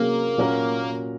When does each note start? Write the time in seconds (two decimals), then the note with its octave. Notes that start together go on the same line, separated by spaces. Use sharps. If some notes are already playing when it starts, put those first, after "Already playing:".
Already playing: C3 F#3 A#3 C#4 G#4
0.38 A#2 F#3 C#4 F#4 A#4